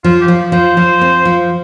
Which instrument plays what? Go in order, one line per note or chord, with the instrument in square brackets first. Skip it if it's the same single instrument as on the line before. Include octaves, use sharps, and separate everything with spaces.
[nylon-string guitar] F3 [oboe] F4
[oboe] G4
[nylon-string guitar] F3
[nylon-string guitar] F3 [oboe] C5
[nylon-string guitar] F3
C4
F3